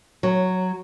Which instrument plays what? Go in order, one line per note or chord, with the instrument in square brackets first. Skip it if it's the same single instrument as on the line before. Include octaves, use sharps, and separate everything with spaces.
[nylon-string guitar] F#3